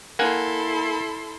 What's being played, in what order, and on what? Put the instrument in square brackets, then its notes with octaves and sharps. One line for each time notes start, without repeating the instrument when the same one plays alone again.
[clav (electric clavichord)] A#3 F#5 G#5 [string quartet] E4 A4 C6